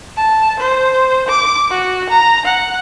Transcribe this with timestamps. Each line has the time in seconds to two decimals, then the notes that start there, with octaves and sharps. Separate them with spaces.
0.17 A5
0.59 C5
1.28 D6
1.70 F#4
2.10 A#5
2.45 F#5